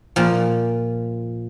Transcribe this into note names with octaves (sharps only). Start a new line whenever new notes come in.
A#2 F3